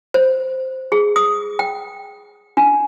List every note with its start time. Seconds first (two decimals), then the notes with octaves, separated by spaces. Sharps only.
0.14 C5
0.92 G#4
1.16 D#6
1.59 G5
2.57 D4